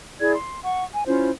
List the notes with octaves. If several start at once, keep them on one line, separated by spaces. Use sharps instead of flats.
E4 G#4 D5 G#6
C6
F#5 C#6
G#5
C#4 E4 F4 C5